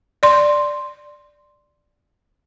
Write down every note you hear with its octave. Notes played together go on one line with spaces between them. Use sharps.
D5 C6